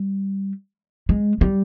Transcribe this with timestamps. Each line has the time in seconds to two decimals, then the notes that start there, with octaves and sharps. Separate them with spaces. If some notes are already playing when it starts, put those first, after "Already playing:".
Already playing: G3
1.09 G#3
1.41 G3